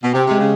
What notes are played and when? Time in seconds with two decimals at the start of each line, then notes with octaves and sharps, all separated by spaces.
0.03 B2
0.14 C3 G4
0.27 C3 G#3
0.40 C#3